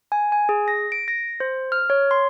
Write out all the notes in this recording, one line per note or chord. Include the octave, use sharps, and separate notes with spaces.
G#5
G#5
G#4
A#6
D7
A#6
C5
F6
C#5
C6